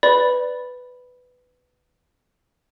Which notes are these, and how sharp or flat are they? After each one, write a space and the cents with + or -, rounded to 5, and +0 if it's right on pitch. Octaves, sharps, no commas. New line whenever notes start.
B4 +10 D5 +0 B5 +0